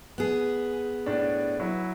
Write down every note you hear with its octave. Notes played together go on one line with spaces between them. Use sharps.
B3 G#4
A2 D4
F#3 E4